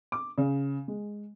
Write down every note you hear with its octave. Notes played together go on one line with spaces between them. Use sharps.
D6
C#3
G#3